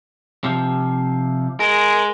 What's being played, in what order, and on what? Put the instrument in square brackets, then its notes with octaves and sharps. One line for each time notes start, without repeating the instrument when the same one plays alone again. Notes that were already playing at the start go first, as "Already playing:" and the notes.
[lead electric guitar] C3 F3
[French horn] G#3 [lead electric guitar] A#4